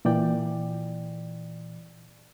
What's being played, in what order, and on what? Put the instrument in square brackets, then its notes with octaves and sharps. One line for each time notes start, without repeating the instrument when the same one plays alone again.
[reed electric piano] A#2 E3 D5 G5